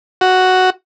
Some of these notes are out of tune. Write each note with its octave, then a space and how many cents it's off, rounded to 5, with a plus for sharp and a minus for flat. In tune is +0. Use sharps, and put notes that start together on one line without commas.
F#4 +5